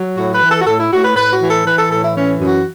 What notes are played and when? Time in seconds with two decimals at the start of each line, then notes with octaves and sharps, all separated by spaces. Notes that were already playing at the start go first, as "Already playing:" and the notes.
Already playing: F#3
0.17 A2 F#4
0.34 B4
0.43 E3
0.50 A4
0.61 F#4
0.66 A2 A4
0.79 E4
0.91 A2 F#4
1.04 B4
1.15 A2 B4
1.33 F#4
1.41 E3
1.49 A4
1.65 E3 B4
1.77 A4
1.90 A2 A4
2.03 E4
2.14 E3 C#4
2.38 F#2
2.47 F#4